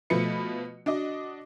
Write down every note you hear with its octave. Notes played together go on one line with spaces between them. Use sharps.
B2 F3 A3 B4 C#7
D4 F#4 D#5